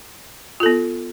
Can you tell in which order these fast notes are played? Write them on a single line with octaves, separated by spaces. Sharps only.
F4 A4 B3